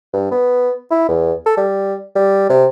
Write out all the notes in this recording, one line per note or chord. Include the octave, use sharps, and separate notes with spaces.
G2
B3
E4
E2
A4
G3
G3
C3